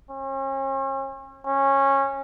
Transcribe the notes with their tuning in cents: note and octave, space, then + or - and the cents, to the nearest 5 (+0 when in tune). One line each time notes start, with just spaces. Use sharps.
C#4 -40
C#4 -20